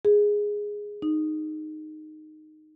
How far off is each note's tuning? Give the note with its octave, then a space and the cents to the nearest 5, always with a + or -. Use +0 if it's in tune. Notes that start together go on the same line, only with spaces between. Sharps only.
G#4 -5
D#4 -10